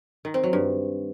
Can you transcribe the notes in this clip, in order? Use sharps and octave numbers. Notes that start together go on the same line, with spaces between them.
D#3
C4
F#3
G2